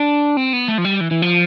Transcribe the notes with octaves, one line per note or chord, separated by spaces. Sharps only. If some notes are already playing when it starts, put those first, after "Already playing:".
Already playing: D4
C4
B3
A3
F3
G3
E3
E3
F3